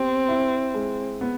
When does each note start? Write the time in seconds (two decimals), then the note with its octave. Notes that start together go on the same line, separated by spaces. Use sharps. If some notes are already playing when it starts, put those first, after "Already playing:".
Already playing: B3 C4 G4
0.28 E4
0.75 G#3
1.21 B3